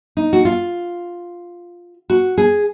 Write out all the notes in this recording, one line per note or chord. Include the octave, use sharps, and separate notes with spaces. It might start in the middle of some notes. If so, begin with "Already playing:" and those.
D#4
F#4
F4
F#4
G#4